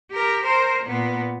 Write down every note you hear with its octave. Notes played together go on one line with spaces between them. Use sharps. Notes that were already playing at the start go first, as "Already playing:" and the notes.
G4 A#4
A#4 C5
A#2 B3